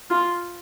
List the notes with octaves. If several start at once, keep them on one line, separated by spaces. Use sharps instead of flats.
F4